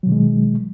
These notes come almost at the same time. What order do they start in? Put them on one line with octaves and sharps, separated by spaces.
F#3 B2 D#3 G#3